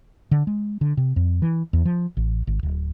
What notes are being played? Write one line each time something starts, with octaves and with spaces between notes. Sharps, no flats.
D3
G#3
D3
C3
F2
E3
E2
F3
A1
G#1
D1